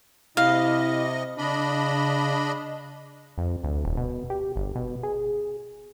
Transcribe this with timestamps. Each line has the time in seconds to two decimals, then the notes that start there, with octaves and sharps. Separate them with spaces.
0.37 C3 E4 D#5 F5
1.38 C#3 D4 D#5 B5
3.38 F2
3.63 D2
3.85 D#1
3.97 B2
4.30 G4
4.56 G1
4.75 B2
5.03 G#4